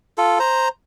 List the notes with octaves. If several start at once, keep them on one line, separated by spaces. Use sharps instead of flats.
F4 A4
C5 A#5